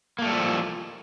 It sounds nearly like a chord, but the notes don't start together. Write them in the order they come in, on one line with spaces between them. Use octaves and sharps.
A#3 A3 G3 A4 F3